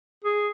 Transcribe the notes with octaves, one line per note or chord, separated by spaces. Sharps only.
G#4